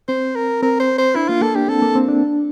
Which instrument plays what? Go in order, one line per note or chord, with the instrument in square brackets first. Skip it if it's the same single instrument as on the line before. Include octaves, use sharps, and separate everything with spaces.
[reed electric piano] C4 [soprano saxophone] C5
[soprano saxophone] A#4
[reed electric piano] C4 [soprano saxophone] A#4
[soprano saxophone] C5
C5
[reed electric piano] D4 [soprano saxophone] E4
[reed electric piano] A#3 [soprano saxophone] F4
[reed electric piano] A#3 [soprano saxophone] A4
[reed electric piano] D4 [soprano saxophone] G4
[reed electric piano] C4 [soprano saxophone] A4
[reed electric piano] A#3
C4
D4